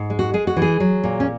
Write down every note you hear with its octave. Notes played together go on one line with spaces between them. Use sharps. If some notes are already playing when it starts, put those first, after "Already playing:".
Already playing: G#2
G#3
F#4
G#3 G#4
F#4
E3
G#4
F#3
A#2
C#4